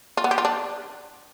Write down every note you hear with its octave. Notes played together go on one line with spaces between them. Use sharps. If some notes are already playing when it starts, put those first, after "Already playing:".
F4
B3
G4
F4
D4